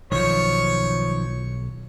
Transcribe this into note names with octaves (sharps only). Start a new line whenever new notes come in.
B1 D#3 F3 C#5